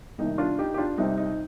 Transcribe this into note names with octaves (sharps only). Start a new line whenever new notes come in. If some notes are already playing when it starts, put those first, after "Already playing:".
C2 C3 D#3 A#3 D#4
D4 F4
D#4 G4
G4
D4 F4
C2 C3 G3 C4 D#4
D#4